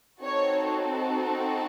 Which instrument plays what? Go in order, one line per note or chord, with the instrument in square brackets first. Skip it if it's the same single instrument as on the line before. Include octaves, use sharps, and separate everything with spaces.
[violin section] C4 D#4 F#4 A4 C#5